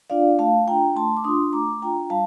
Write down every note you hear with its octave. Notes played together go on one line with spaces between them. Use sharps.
D4 F4 D5 F5
A3 F5 A5
D4 F4 G5 A#5
A3 A5 C6
D6
D4 F4 C6 D#6
A3 A#5 D6
D4 F4 G5 A#5
G3 F5 A5